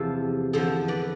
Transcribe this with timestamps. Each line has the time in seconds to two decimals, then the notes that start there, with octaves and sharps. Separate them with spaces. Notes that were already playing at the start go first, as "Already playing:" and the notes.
Already playing: E2 C3 F3 F4 A4
0.53 E2 D3 F3 A4 C5
0.88 B4 D5